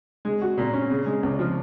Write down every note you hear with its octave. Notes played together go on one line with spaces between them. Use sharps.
G#3
F#4
A#2
C#4
C#3
G#3
C#2
F3